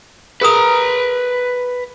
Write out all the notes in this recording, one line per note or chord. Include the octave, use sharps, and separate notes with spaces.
G#4 A#4 B4 A#5 D#6